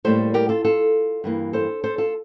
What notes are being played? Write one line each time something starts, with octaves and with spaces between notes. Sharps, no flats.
A2 G3 A#3 A4 C5
G4 A#4
F4 A4
F4 A4
G2 E3 A#3
A4 C5
A4 C5
F4 A4